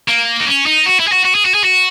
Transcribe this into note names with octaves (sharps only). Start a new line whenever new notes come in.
A#3
D#4
C#4
D#4
F#4
E4
G#4
F#4
F#4
G#4
F#4
G#4
F#4